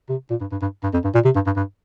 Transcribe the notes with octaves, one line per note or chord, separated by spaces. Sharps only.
C3
A#2
G2
G2
G2
G2
F2
G2
A#2
C3
G2
G2
G2